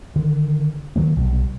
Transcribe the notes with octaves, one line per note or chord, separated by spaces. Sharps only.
D3 D#3
D#3 F#3 A#3
B1 C3 G3